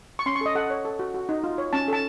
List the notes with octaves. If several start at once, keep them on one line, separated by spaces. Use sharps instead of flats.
C#6
C#4 C6
C#6
A4 D#5
A4 F#5
C#5
A4
F#4
F#4
D#4
F4
C#5
C#4 A5
A4 A5